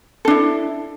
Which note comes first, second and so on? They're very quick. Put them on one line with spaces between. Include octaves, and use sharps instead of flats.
A4 D4 E4